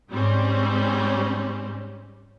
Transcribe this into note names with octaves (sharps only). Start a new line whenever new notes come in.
G#2 G3 C4 C#4